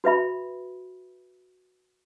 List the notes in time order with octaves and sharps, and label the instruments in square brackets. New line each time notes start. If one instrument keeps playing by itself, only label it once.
[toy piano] F#4 B4 E5 B5